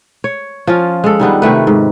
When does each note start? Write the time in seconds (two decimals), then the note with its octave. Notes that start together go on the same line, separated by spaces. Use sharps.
0.24 C#5
0.67 F3 C#4 F4
1.04 G#3 A4
1.20 D#3 G3 B3 D4
1.42 C3 D#3 A3 B4
1.67 G#2